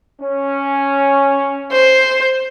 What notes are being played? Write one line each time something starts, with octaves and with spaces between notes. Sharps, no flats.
C#4
C5